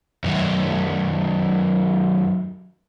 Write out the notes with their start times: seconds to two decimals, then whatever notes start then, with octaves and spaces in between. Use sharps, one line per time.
0.24 F#2 D#3